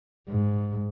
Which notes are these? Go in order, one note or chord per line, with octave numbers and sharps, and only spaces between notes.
G#2